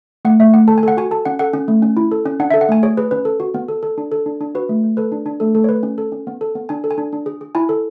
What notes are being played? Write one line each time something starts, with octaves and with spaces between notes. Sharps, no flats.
A3 F#5
A3 E5
A3 F#5
A4 A5
G#5
A4 F#5
F#4 G#5
A4 A5
C#4 F#5
A4 F#5
C#4
A3
C#4
E4
A4
C#4
D4 F#5
E5
A4
F#5
A3 G#5
G#4 C#5
G#4 B4
C#4 B4
A4
F#4
B3
A4
A4
D4
A4
D4
D4
F#4 B4
A3
A3
A4 B4
D4
D4
A3 A4
A3 A4
C#5
A3 B4
C#4
A4
C#4
B3
A4
B3
D4 G#5
A4
G#5
D4
D4
G#4
G#4
E4 G#5
A4